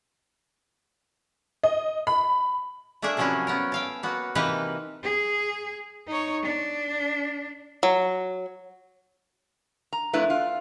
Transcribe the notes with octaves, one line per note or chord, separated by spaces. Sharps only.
D#5
B5
A3 A#3 D4 G#4 E5
C3 F3 F#3 A#3 C#4 E4
B3 C#4 A#4
A4 F5 G5
A#3 B3 F#4
C3 E3 A#3 D#4 A4 B4
G#4
D#4 C#5
D4
F#3
A#5
F2 A3 D4 E4 B4
F4